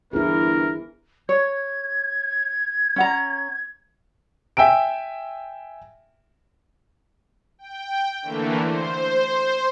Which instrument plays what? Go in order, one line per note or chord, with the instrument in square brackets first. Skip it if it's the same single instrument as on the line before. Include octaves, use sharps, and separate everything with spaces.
[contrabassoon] G1 [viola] E3 [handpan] E4 G#4 [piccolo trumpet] A#4
[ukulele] C#5 [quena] G#6
[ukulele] C#4 F#5 A#5
[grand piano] E5 G5 G#5 E6 D7
[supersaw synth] G5
D3 E3 A3 A#3
C5